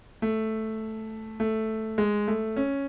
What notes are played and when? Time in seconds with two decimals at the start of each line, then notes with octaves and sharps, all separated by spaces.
0.22 A3
1.40 A3
1.98 G#3
2.28 A3
2.57 C#4